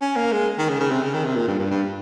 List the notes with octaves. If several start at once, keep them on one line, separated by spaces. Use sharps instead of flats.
C#4
A#3
G#3
D#3
C#3
C#3
C3
C#3
D#3
C3
A#2
G2
G2
G2